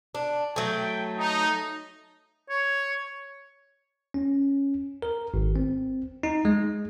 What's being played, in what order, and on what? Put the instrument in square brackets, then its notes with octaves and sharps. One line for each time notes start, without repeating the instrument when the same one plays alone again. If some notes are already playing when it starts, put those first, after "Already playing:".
[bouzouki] D4
[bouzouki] F#3 A3 [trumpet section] G5
[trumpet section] D#4
[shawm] C#5
[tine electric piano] C#4
A#4
G#1
C4
D#4
G#3